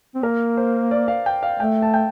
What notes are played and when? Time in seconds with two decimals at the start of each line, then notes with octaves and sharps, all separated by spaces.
0.15 C4
0.23 A#3 A#4
0.57 C5
0.91 D5
1.08 F5
1.26 G5
1.43 F5
1.60 A3 G5
1.82 A5
1.94 G5